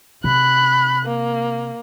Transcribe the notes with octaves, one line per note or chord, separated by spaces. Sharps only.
C3 B5 F#6
A#3